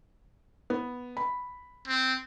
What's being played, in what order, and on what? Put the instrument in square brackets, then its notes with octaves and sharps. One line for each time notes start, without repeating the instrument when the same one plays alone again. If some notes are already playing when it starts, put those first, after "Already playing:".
[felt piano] B3
B5
[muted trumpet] C4